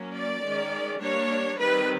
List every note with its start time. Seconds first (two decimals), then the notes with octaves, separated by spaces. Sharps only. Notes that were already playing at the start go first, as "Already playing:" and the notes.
Already playing: F#3 A#3 C#4
0.15 D5
0.44 D#3 G#3 C#4
1.01 G3 A#3 D4 C#5
1.59 D#3 G3 C4 B4